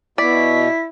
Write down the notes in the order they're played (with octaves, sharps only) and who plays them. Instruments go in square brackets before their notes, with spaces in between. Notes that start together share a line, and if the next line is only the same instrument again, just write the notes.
[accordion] B2 [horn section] E4 [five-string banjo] D5 [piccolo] B6